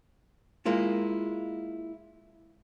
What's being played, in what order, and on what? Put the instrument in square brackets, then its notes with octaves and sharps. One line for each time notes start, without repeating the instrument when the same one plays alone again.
[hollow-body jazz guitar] G#3 A#3 E4 F4